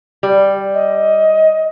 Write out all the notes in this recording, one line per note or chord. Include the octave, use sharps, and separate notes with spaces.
G3
D#5